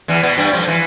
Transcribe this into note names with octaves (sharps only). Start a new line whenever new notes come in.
E2 E3
B2 B3
G2 G3
F2 F3
E3